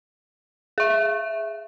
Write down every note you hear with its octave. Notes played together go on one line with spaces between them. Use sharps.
G#4 E5